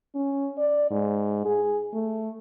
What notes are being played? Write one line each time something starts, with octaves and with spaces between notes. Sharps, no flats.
C#4
D5
G#2
G#4
A3